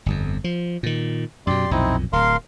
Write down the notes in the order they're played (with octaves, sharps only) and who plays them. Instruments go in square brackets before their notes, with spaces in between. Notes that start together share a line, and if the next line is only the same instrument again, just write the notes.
[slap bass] G1 F2
F3
A#2 D#3
[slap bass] F#2 B2 [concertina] G4 D5 C6
[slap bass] B1 F2 A#2 [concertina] C4 D#4 E4
[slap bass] D1 [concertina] A#4 F5 C6